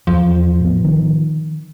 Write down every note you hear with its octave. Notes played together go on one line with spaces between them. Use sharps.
E2 F3
A1 B3
D#3